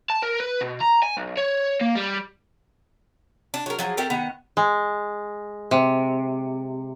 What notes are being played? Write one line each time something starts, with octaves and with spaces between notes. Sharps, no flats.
A5
A#4
B4
B2
A#5
G#5
B1
C#5
A#3
G3
D4
F#3 A#4
F3 F#3 G#4
A3 C4 G4 A#4
D#3 B3 F#5
G#3
C3